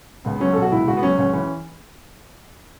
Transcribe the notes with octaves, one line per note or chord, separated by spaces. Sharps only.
C#2 B3
B3
F#3 C#4
B2 A4
F#4
C#2 E4
C#2 F#4
B3
F#3 C#4
C#2 C#4
E3 C#4